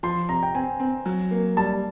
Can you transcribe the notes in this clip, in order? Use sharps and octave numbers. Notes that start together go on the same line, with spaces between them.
F3 C6
C3 A#5
G5
C4 G#5
C4
F#3
A#3
G3 A5